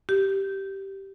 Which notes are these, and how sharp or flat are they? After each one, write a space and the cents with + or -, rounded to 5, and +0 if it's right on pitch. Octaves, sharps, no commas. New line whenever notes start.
G4 -10